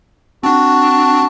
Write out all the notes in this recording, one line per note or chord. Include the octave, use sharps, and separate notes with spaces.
C4 D4 F#4 A5